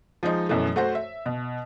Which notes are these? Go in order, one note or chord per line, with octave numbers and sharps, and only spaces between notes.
F3 G#3 D#4
F#2 B2 E3 A3
A3 F#4 C5
E5
B2